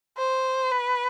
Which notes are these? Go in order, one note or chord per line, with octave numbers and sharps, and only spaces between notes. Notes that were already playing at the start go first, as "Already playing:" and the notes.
C5
B4